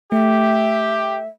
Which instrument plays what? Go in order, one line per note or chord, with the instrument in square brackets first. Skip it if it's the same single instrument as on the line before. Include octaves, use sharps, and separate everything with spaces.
[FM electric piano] A3 [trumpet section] G4 [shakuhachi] E5